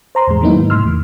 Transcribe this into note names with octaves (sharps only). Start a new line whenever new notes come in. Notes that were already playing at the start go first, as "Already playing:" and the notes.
C5 A#5 C6
E2 A2 G#3
D#3 F#3 A#3 B3 D#4 E4
G#2
A2 C3 C6 E6 F6
E2 D#3